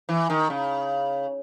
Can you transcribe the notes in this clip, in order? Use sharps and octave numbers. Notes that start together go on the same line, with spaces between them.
E3
D#3
C#3